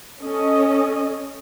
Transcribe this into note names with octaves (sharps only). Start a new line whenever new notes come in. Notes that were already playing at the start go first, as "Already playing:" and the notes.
C#4 A4 D#5